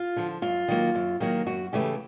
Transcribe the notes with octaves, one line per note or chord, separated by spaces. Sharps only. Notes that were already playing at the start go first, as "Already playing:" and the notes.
Already playing: F4
D3 F3
F#2 F4
D#3 F#3 A#3
F#2
D#3 F#3 A#3
F#2 F#4
C#3 E3 A3 G4